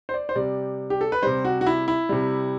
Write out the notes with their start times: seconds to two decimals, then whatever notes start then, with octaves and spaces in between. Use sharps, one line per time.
0.09 C5
0.14 D5
0.29 C5
0.36 C3 G3 D5
0.90 G4
1.01 A4
1.12 B4
1.23 C3 G3 C5
1.45 F#4
1.61 F#4
1.67 E4
1.88 E4
2.09 C3 G3